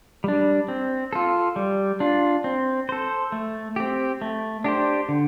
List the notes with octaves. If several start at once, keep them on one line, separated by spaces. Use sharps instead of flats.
G3 D4
C4
F4 A4
G3
D4 F4
C4
A4 C5
A3
C4 G4
A3
D4 G4 C5
D3